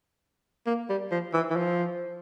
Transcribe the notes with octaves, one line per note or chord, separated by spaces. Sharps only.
A#3
G3
F3
E3
E3
F3